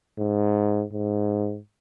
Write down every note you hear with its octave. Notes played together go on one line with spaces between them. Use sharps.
G#2
G#2